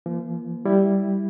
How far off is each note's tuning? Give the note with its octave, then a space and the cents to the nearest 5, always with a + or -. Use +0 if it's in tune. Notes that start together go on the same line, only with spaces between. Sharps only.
F3 -40 A#3 +20
G3 +0 E4 -5